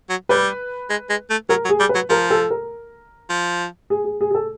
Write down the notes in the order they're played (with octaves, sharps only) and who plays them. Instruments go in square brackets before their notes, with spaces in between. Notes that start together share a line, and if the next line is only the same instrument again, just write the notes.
[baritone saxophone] F#3
[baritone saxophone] G3 [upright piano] B4
[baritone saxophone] G#3
G#3
A3
[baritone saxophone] F#3 [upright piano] A#4
[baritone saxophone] F#3
[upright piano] G#4
[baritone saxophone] G3
[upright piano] B4
[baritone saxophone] F#3
[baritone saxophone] F3 [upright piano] A#4
[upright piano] A4
A#4
[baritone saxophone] F3
[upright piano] G#4
G#4
G#4
G#4
A4